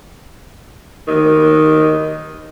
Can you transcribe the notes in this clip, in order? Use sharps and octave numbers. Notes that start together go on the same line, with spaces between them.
D#3